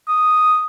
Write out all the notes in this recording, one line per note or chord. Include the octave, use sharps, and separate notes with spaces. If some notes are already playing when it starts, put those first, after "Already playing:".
D#6